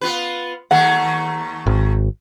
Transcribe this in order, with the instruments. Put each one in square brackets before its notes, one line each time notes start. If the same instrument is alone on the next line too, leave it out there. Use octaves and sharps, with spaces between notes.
[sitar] B3 F4 B4
[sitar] D#2 F#3 A3 [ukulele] F#5
[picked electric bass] G#1